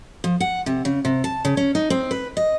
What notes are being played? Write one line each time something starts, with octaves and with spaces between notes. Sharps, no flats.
F3
F#5
C3
C#3
C3
A5
C#3
C#4
D#4
C4
B4
D#5